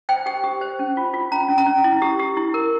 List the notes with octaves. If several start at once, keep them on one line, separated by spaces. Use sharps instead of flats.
C5 G5
G4 G5
G4
C5
C#4
F4
F4
C#4 A#5
C#4
A#5
C#4
E4
G4
G4
E4
A#4